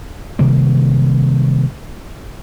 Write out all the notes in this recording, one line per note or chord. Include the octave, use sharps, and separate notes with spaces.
C3 D#3 G3 A#3